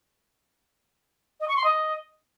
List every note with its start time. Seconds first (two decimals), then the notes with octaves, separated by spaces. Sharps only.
1.40 D#5
1.48 C#6
1.56 C6
1.64 D#5